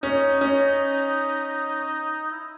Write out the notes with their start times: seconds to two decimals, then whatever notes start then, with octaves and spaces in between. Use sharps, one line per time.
0.03 C#4 D#4
0.41 C#4
2.31 E4